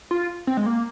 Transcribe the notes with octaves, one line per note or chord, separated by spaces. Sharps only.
F4
C4
G#3
A#3